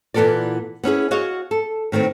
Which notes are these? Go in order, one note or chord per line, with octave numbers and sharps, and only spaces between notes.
A#2 E3 B3 A4 A#4 D5
B3 C#4 E4 G#4
F#4 G#4 C#5 D#5 F5
A4
A2 D#3 B3 C4